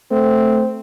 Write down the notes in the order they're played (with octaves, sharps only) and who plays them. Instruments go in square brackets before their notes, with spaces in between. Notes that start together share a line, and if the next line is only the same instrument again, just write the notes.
[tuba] A3 [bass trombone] C4